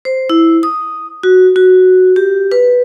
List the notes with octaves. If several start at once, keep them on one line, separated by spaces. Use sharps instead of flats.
C5
E4
D#6
F#4
F#4
G4
B4